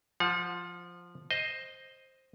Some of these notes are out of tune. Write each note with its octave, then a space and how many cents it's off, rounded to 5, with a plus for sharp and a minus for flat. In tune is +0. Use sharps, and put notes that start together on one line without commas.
F3 +0 F#5 -40
C5 +10 D#5 +0